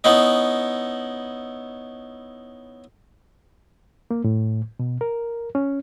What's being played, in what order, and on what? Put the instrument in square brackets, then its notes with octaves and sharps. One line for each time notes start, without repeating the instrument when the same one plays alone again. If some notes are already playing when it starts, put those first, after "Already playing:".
[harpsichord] B3 C#4 D#4 E4 D#5
[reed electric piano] A#3
A2
B2
A#4
C#4